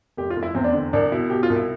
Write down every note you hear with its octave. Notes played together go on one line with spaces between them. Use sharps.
F1 G4
F4
F1
E4
E2 C4
D4
D3 C4
C2 D4
B2 E4
B2 G4
F4
C2
E4